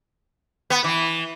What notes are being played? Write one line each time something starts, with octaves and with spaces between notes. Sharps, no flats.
B3
E3